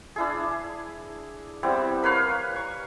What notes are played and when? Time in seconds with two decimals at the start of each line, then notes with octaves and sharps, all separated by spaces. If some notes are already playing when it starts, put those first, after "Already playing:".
0.16 D4 E4 G#4
1.63 G3 B3 C4 E4
2.02 A#4 B4 C#5 F5
2.56 C#6